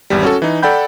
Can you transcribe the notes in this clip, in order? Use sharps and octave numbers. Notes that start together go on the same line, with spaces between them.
G#1 E2 G3
C#4 F#4 A4
E3 D#4
A4 D5 F#5 G5 B5 G6